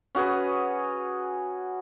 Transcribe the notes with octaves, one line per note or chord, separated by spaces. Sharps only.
C#4 F#4 G#4 B4